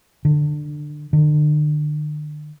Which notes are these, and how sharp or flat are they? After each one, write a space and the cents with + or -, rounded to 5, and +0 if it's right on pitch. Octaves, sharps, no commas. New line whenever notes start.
D3 +20
D3 +40